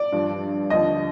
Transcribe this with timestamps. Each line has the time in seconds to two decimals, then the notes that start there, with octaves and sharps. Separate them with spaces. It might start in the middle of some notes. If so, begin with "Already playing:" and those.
Already playing: D5
0.12 G2 F3
0.70 D#2 D3 F3 D#5